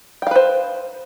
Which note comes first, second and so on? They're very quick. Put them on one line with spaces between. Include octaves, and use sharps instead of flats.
G5 F5 B4 C5